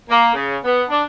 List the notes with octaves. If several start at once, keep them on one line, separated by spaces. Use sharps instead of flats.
A#3
C#3
B3
D4